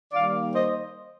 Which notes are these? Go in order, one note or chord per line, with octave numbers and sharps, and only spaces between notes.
D#3 G3 A#3 D5 F5
C5 D#5